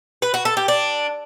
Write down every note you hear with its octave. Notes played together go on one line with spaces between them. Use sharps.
B4
F#4
A4
G4
D4